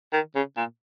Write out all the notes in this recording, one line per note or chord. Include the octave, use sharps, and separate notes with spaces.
D#3
C#3
A#2